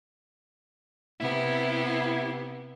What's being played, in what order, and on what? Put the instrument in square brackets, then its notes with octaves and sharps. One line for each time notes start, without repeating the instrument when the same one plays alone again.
[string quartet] C3 B3 G4 [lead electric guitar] E4